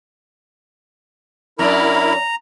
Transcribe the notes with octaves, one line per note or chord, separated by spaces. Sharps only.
F#2 D4 E4 A#4 A#5 B5